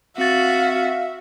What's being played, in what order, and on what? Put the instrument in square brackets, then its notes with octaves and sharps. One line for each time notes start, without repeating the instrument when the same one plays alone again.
[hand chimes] C4 A6 [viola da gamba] F#4 [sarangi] E5 [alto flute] F5